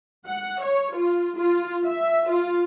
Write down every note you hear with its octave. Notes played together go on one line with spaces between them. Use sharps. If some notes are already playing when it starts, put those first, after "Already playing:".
F#5
C#5
F4
F4
E5
F4